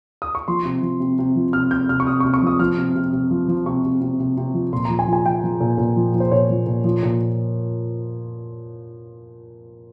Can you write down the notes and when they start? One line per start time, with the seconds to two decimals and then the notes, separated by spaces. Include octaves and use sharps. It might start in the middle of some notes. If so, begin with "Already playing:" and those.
0.22 D#6
0.35 C#6
0.48 F3 C6
0.65 C3
0.82 F3
1.00 C3
1.18 C3
1.35 F3
1.53 C3 F6
1.71 C3 G6
1.89 C3 F6
2.00 C#6
2.07 C3 D#6
2.20 C#6
2.25 C3
2.34 C#6
2.42 F3 D#6
2.59 F3 F6
2.78 C3
2.95 C3
3.13 C3
3.31 F3
3.48 F3
3.66 C3 C#6
3.84 C3
4.01 C3
4.20 C3
4.37 C3
4.54 F3
4.72 A#2 C6
4.85 F3 A#5
4.99 G#5
5.07 F3
5.13 G#5
5.26 F3 G5
5.44 F3
5.60 A#2
5.78 A#2
5.96 F3
6.14 F3
6.20 C5
6.31 A#2 C#5
6.50 F3
6.66 A#2
6.84 F3
7.03 A#2